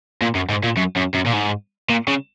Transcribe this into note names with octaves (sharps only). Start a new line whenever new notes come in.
A#2
F#2
G#2
A#2
F#2
F#2
F#2
A#2
G#2
A#2
C#3